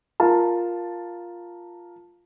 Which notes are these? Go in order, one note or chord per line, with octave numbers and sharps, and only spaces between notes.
F4 A#4 A5